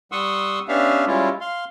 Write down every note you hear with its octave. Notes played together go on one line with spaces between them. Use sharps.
G3 F#5 C6 C#6 D#6 E6
B3 C#4 D4 G4 E5 F5
G3 G#3 C#4 E4 F4
F5 C6